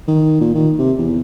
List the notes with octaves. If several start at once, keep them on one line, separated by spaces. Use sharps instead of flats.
D#3
A#2
D#3
C3
E2